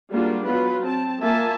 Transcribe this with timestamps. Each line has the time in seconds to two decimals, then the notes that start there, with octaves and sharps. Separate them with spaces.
0.11 G3 G#3 A#3 D4 F4 F#4
0.45 F#3 B3 F4 B4
0.83 C4 A5
1.22 A#3 F4 E5 G#5 A5